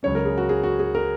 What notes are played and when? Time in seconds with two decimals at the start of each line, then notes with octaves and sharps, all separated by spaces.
0.03 C#2 C#3 F#3 C#4 C#5
0.15 A#4
0.25 G#4
0.38 F#4
0.49 G#4
0.64 F#4
0.79 G#4
0.95 A#4